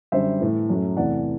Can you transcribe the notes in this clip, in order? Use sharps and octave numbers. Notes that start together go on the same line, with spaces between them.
F#2 D3 G3 C5 E5
A2 E3 A3
F#2 F#3 A3
E2 C3 E3 A3 D5 F#5